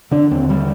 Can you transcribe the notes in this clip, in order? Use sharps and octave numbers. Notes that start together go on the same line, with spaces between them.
D3 D4
D#2 C4
D3 G3